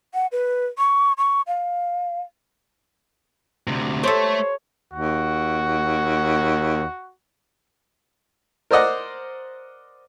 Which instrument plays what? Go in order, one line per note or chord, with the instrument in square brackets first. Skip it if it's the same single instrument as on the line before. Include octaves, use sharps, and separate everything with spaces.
[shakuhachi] F#5
B4
C#6
C#6
F5
[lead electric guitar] D2 C3
[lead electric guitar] A3 [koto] G4 A4 [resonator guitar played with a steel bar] C5 [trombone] C#5
[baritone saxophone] D#2 [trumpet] F#4
[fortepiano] A#4 C5 D5 D#5 F#5